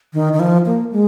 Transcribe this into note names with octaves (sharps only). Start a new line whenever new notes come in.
D#3
D#3
F3
A#3
G#3